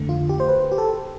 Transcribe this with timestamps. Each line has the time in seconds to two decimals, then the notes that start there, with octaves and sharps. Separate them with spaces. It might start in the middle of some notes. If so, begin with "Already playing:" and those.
Already playing: F2 D3 A3
0.09 F4
0.29 G4
0.40 C5
0.48 B4
0.72 G4
0.78 A4